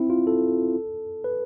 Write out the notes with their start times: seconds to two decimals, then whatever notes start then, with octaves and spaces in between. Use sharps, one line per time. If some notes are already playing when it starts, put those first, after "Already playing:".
Already playing: C4 E4
0.10 F4
0.27 A4
1.24 B4